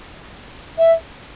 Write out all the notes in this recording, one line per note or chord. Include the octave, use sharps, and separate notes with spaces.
E5